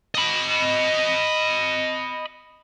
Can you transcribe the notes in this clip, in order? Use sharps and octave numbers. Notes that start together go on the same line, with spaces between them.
D#5 B5